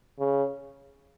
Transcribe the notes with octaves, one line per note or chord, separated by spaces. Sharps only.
C#3